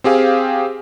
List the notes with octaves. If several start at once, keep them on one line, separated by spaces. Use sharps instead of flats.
C4 G4 G#4 F5